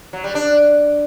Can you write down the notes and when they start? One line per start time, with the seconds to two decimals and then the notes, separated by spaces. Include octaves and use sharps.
0.13 F#3
0.24 G3
0.35 D4